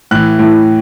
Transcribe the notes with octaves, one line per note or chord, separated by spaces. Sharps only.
A2 E3 F#6
A2 E3